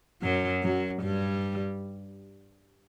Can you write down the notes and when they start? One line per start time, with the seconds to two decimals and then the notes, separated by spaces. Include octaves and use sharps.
0.22 F#2 F#3
0.63 F#2 F#3
1.02 G2 G3